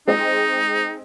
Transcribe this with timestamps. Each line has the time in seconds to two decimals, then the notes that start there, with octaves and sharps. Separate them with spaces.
0.07 G#3 C4 D#4 D#5